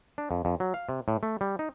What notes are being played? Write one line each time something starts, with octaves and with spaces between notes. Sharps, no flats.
D4
F2
F2
F#3
F5
C3
A2
A3
G3
D#4